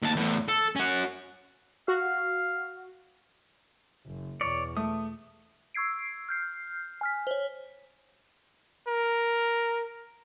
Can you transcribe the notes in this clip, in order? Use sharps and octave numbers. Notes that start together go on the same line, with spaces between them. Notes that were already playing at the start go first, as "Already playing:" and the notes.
D#2 A5
E2 A2
A4
C#4 F#4
F#4 F5
F#1
E2 B2 C#5 D5
A3 D#6
C#6 E6 G#6 C7 D7
F6 G6 C7
G#5 F6 B6
C5 C#5
A#4